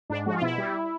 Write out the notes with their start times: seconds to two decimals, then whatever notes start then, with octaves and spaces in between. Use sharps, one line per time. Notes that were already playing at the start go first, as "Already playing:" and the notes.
0.10 G#2 D4
0.26 F3 G#3 F#4
0.34 F4
0.42 B2 E4
0.58 G3